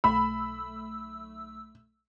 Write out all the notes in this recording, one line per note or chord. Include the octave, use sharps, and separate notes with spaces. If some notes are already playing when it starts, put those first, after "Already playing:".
B1 A3 B5 E6